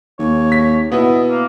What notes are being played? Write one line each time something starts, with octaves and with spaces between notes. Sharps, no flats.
D#2 C#5
B6
B2 B3 E4 D#5
A#3